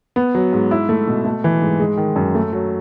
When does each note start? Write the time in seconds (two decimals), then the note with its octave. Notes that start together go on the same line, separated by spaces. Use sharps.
0.16 B3
0.35 F#3
0.53 G#2
0.71 E4
0.89 A3
1.07 B2
1.25 A3
1.44 E3
1.62 G#2
1.80 G#3
1.97 D#3
2.16 F#2
2.35 A3
2.53 F#3